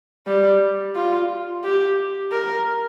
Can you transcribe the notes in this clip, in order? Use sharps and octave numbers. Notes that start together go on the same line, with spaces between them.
G3
F4
G4
A#4